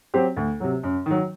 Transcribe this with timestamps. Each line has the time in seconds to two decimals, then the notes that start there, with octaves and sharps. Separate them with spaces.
0.14 F#3 C4 G4 C5
0.37 D2
0.60 C3 F#3
0.83 F#2
1.06 D#3 F#3